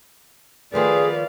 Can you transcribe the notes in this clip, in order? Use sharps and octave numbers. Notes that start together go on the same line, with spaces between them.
D#3 F3 A3 G#4 B4 D5 F5